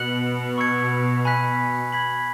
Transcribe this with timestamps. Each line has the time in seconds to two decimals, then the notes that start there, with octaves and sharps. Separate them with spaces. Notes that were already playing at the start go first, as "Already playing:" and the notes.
Already playing: B2 F#6 C#7 F#7
0.58 C#6 E6 G#6 C#7
1.25 G#5 B5 F#6 B6
1.92 B5 G#6 B6 F#7